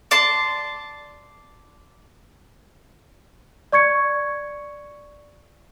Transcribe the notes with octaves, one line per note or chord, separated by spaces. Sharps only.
D5 A5 C6
D5 C#6 G#6 C#7